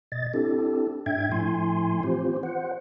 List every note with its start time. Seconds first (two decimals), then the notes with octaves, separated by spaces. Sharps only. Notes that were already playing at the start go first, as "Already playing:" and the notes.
0.12 B2 D#5 A6
0.34 C4 D4 E4 G4 A4
1.06 G#2 D4 E5 G5 G#6
1.32 A2 F3 A3 E4 G#5 C6
2.03 E3 C4 F4 G4 C5
2.43 C5 F#5